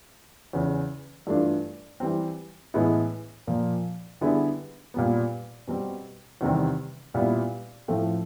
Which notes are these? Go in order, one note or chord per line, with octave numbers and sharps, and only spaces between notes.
E2 C#3 E3
G2 E3 A3 D4 F4
E3 G3 C4
A2 E3 G#3 B3 E4
A#2 F3 A#3
D3 G3 B3 E4 G#4
A#2 G3 B3
B2 G3 C4
E2 C3 D#3 G3 C4
A#2 G3 B3 E4
A2 F3 A3 C4